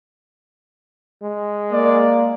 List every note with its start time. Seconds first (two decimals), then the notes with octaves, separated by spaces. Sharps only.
1.23 G#3
1.72 A#3 D5